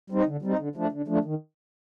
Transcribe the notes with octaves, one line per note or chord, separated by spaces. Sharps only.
G3 C4 D#4
D3
G3 C4 D#4
D3
F3 A3 D4
D3
F3 A3 D4
D#3